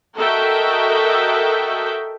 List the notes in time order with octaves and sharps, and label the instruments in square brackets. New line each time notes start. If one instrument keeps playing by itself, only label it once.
[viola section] F#4 A4 A#4 D#5 E5 G5